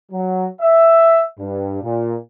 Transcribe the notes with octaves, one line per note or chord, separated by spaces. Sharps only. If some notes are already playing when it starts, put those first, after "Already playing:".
F#3
E5
G2
A#2